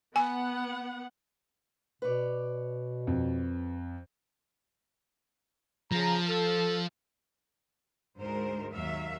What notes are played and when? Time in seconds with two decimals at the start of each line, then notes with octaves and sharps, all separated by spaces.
0.16 B3 F#5 G#5
2.02 B2 B4 C#5 D5
3.07 F2
5.92 C#3 F3 A#5
6.27 A4
8.19 D2 G#2 G#3 A#4 C5
8.71 D#2 F#3 E5 F5